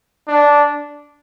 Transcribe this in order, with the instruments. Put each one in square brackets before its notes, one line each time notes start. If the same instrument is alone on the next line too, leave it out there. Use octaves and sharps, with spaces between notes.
[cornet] D4